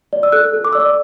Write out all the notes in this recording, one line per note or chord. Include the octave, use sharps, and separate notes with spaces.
D5
E6
A4 F#6
A4
D6
D5 E6
D6